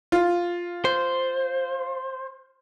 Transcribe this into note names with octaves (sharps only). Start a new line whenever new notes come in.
F4
C5